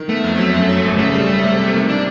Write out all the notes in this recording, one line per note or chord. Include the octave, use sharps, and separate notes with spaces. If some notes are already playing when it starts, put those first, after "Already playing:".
Already playing: D#3
A3 B3
F2
F#3
F#2
F#3
G#1
C#3 A3
G3
G3
C3
C3
D#3
D4